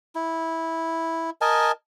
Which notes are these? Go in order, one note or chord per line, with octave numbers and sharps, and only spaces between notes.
E4
A#4 D#5 G#5 A5